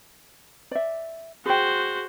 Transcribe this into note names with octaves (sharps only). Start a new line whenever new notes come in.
D5 E5
F#4 G#4 C5 G5